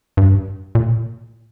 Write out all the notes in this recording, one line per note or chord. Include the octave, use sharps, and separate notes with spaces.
G2
A#2